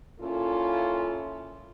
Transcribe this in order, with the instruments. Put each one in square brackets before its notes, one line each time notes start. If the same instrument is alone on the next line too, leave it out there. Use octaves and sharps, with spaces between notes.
[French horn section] A#2 C#4 E4 F4 A4